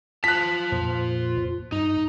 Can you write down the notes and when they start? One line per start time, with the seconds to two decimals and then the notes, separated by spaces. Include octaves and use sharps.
0.24 F4 A5 F#6 B6
0.72 F2 A#2 C5
1.72 G2 D#4